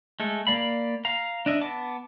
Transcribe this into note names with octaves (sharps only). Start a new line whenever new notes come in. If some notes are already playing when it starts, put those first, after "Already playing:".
G#3 A3 A4
A#3 D5 F5 B5
F5 A#5
D4 D#5 E5
B3 A5 D6